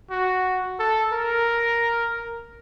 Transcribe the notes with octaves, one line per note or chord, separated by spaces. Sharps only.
F#4
A4
A#4